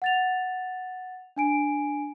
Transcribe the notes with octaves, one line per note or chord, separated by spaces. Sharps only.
F#5 A6 F7
D4 G#5 D7